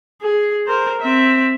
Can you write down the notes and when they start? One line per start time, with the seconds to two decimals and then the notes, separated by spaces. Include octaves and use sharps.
0.21 G#4
0.67 A#4 C5
1.02 C4 E5